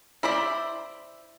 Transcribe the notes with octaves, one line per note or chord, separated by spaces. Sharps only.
E4 C5 D5 B5